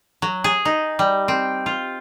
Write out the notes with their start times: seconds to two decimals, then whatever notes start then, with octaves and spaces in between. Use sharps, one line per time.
0.22 F#3
0.44 G#4
0.65 D#4
0.99 G3
1.28 C4
1.66 F4